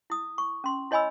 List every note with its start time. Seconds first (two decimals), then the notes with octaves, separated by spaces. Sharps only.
0.10 E4 D#6
0.38 C#6
0.64 C#4 C6
0.91 E4 C#5 D#5 G#5 B5 E6